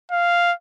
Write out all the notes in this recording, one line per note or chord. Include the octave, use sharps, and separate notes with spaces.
F5